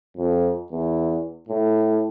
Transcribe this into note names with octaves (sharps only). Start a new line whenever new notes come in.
F2
E2
A2